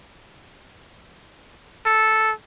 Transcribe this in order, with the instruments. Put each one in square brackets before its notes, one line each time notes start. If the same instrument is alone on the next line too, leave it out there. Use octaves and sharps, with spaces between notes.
[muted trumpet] A4